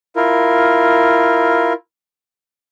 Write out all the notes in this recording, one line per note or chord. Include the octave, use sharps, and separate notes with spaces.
E4 F4 A#4